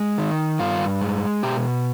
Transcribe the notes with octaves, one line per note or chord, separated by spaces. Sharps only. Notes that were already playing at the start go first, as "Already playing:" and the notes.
Already playing: G#3
D#3
G2 F4
G#3
B2 G4